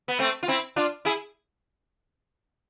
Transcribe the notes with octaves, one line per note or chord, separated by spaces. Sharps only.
B3
A3 C4
F4
C4 E4
D4 F4
E4 G#4